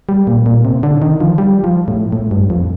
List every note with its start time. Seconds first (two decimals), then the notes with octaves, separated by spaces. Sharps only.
0.09 G3
0.27 A#2
0.46 A#2
0.65 C3
0.83 D3
1.02 D#3
1.21 F3
1.38 G3
1.64 F3
1.88 A2
2.12 A2
2.31 G2
2.50 F2